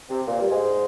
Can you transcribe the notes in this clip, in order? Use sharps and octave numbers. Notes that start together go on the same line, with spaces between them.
C3 C4
A#2 A#3
G2 G3
G#2 G#3